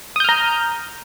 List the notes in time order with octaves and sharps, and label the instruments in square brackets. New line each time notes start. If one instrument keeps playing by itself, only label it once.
[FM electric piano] D#6
G6
F6
A#5